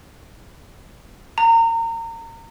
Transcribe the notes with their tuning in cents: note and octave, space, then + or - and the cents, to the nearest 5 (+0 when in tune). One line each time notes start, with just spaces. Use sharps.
A#5 -30